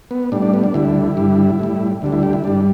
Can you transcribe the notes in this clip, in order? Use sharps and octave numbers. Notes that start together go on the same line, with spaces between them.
B3
A2 G3 D4
D4
B3
D4
D2 D3 G3 E4
G2 D3 G3
A2 G3
D2 D3 G3
E4
G4
E4
G2 G3 D4